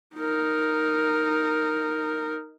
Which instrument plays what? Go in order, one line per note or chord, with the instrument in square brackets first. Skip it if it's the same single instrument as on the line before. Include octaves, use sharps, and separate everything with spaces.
[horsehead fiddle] D#4 A#4